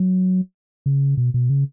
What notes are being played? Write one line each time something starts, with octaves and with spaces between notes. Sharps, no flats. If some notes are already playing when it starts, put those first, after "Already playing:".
Already playing: F#3
C#3
B2
B2
C#3